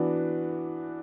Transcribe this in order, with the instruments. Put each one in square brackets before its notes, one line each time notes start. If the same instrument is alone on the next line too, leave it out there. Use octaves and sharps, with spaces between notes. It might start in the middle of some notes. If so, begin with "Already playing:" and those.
Already playing: [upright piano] E3 B3 D4 F#4